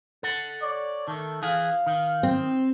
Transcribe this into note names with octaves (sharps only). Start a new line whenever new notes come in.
A4 F#5
C#5 D5
D#3 A3 A4
E3 G#4 F5
D#3
C4